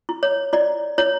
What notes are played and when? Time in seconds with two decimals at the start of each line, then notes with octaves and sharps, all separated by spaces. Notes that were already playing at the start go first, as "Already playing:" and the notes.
0.09 E4
0.23 C#5
0.53 E4 D5
0.98 E4 C#5